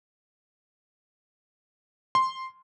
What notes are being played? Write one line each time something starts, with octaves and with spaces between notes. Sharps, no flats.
C6